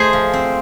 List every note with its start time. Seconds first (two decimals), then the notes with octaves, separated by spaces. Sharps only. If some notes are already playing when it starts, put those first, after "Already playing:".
Already playing: A3 G#4 C5 D#5
0.13 F3
0.33 C4